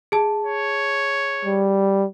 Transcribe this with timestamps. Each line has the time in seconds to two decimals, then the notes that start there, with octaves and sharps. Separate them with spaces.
0.12 G#4 A5
0.45 C#5
1.45 G3